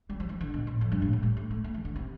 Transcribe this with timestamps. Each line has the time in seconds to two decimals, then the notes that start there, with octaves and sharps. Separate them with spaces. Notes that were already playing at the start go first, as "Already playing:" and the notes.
0.09 G3
0.20 F3
0.29 E3
0.41 D3
0.54 B2
0.67 A2
0.81 F2
0.92 G2
1.02 A2
1.13 A2
1.23 G3
1.37 A3
1.51 A3
1.64 A3
1.74 E3
1.85 D3
1.96 C3